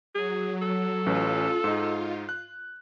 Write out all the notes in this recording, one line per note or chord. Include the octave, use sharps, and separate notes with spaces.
F#3 G#4
A4
A1 C#4 F4 B4
G#2 D#4
F#6